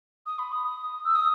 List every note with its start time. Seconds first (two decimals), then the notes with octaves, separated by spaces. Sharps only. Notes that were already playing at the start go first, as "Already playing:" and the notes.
0.26 D#6
0.39 B5
0.52 D#6
0.65 D#6
1.04 E6
1.15 D#6